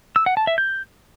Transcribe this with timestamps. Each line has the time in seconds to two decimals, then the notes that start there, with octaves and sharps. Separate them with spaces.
0.16 E6
0.26 F#5
0.37 A5
0.47 E5
0.58 G6